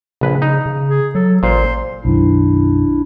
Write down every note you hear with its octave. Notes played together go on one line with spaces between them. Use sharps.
A#1 C#3 B4
D#4
C#3
G#4
F#3 A4
A1 A#2 C5
B1 F#2 D#3 D4 E4